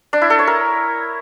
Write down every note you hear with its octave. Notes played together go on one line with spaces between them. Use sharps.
D4
E4
A4
C#5
A#4